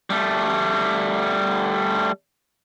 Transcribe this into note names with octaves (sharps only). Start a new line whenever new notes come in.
G3 A3